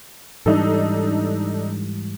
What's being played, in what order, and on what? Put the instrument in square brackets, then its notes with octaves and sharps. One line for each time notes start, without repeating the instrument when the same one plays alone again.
[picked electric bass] G#2 E3 G3 [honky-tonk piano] D4 D#4 A4